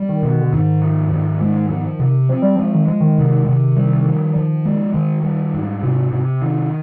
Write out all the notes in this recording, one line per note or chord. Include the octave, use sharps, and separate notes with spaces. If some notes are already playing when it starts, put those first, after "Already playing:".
Already playing: G3
D#3
B2
D3
G#2 D#3
F3
G#2
G#3
F3
C3
F3 C4
G3
F3 G#3
D#3
F3 G#3
D#3
C3
C3
G3
F3
F3
G#3
D#3
G3
G#2
C3
C3
D#3